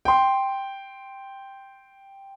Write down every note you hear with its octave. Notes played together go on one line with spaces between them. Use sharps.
G5 C6